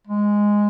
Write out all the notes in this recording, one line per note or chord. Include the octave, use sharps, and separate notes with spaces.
G#3